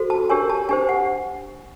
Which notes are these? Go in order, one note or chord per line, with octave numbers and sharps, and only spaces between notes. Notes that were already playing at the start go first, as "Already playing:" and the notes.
Already playing: F#4 A4 C5
A5
D4 G4 A#4 C#5 G#5
A5
D4 G4 C5 G#5
F#5